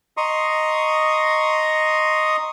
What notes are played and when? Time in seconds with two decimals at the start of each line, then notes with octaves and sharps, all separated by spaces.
0.17 D#5 A#5 C6 C#6 D#6